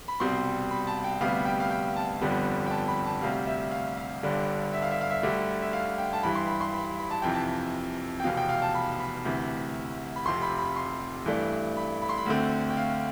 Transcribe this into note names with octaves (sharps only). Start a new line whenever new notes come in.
B5
C2 B2 G3 C4 C6
B5
A5
G5
D2 C3 G3 B3 F5
G5
F5
G5
A5
G1 F2 D3 G3 B3
G5
A5
B5
A5
D2 C3 G3 F5
E5
F5
F5
G1 G2 D3 G3 D4
E5
F5
E5
F5
E5
D2 D3 G3 E5
E5
F5
G5
A5
G2 E3 G3 B5
C6
B5
C6
B5
B5
A5
F2 C3 E3 G5
A5
G5
F1 E2 B2 F5
G5
F5
A5
B5
B5
D2 C3 E3
B5
F1 F2 C3 C6
B5
B5
C6
G2 E3 A3 D4
B5
B5
C6
B5
D2 D3 A3 C4
G5
F5